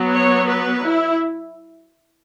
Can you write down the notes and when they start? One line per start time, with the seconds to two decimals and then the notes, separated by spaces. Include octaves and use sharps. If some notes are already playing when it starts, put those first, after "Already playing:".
Already playing: F#3 B3
0.13 C#5
0.47 B4
0.83 E4